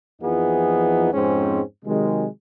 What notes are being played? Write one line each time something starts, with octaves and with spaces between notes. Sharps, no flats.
F2 E3 F3 B3 D#4 G#4
F2 G#2 G#3 C4 C#4 G#4
C3 D#3 F#3 G#3